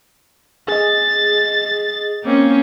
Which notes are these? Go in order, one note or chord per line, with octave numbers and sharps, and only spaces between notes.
G#4 D#5 A6
A#3 C4 C#4